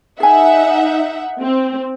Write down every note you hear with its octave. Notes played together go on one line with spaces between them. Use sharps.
D#4 G#4 E5 F#5 G#5
C4